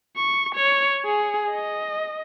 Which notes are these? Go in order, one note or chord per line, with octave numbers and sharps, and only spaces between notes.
C#6
C#5
G#4
D#5